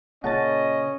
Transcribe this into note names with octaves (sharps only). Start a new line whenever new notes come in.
A#2 C#3 C#4 D#5 F#5 A5 A6